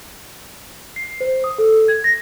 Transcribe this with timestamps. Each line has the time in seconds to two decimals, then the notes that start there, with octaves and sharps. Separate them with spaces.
0.96 C7
1.21 C5
1.44 D#6
1.58 A4
1.88 G#6
2.04 A#6